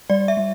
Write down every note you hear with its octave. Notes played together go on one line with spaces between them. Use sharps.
G3 D5
E5
G3